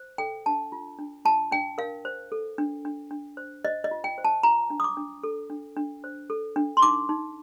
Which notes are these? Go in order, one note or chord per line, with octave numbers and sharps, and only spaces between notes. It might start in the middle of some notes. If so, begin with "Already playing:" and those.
Already playing: C5
A4 G5
D4 A5
F4
D4
F4 A5
D4 G5
A#4 F5
C5
A4
D4
D4
D4
C5
C5 D#5
D#5
F4
G5
C5
A5
F4 A#5
D4
D#6
D6
D4
A4
D4
D4
C5
A4
D4
C6
D#4 D6
D#4